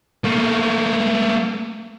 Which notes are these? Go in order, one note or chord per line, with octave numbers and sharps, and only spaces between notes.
A3 A#3